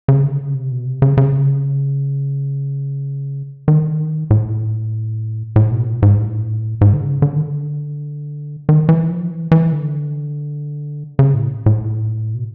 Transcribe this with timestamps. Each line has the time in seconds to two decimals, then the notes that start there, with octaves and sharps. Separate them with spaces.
0.08 C#3
0.23 D3
0.40 C#3
0.54 C3
0.71 B2
0.86 C3
1.02 C#3
1.17 C#3
3.68 D#3
4.31 A2
5.56 A2
5.72 B2
5.86 A#2
6.02 G#2
6.18 A2
6.81 G#2
6.93 D3
7.01 C#3
7.22 D3
7.36 D#3
7.44 D3
8.69 D#3
8.89 E3
9.10 F3
9.31 E3
9.51 E3
9.72 D3
11.19 C#3
11.34 A2
11.66 A2
12.35 B2